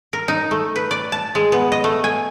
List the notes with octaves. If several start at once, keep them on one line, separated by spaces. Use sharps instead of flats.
A#4
D#4
A3
B4
D5
A5
G#3
B3
D#5
A3
G#5